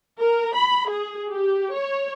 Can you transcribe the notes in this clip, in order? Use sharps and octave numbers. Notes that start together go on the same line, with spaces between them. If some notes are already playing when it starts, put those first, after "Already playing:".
A#4
B5
G#4
G4
C#5